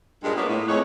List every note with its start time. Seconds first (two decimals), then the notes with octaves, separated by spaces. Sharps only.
0.23 G2 A#2 G#3
0.36 A#3 B3 D4 C#5 D5
0.48 A2
0.67 F2 G#3 B4 C#5